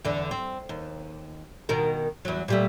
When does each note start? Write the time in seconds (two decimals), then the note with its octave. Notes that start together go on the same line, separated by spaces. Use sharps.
0.04 E2 D3
0.31 C4
0.69 D#2
1.69 B2 D#3 A#4
2.25 E2 F#3
2.48 A#2 G3 A3